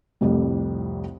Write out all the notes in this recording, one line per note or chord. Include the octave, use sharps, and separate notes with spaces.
C2 F2 A2 G3